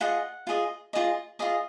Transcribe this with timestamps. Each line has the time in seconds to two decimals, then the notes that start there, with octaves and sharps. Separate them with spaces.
0.01 F4 G#4 D#5 F#5
0.47 F4 G#4 D#5
0.93 F4 G#4 D#5
1.39 F4 G#4 D#5